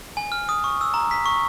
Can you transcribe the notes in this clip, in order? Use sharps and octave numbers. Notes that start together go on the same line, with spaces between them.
G#5
F6
D#6
C#6
E6
A#5
B6
C#6